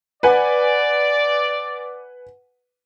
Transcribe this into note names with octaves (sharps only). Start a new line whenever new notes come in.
B4 D5 F#5 G#5